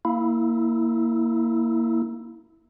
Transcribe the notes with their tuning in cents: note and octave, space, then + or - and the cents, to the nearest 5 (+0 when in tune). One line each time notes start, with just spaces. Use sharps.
A#3 +0 E4 -10